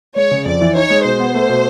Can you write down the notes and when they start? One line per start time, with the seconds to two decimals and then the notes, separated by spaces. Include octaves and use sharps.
0.16 G#3 C#5
0.31 C#3
0.46 F2 D5
0.61 E3
0.76 D#4 C#5
0.90 G#3
1.05 B2 C5
1.20 B3
1.35 A3
1.49 B2